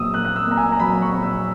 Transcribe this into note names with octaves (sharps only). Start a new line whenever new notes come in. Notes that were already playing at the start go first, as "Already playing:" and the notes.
Already playing: A#1 A#2 F#3 D#6 E6
A#3 F#6
F#6
E6
A#2 A#5
G#5
A#5
F#3 B5
C#6
A#1
E6